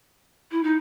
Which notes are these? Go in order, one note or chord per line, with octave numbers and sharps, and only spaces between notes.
E4
D#4